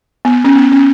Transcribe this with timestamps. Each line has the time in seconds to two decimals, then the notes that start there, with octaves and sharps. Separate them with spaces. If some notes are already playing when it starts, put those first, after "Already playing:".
0.25 B3
0.45 C#4
0.55 B3
0.72 C#4